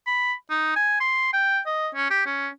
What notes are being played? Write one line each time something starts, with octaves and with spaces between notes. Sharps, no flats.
B5
D#4
G#5
C6
G5
D#5
C#4
G4
C#4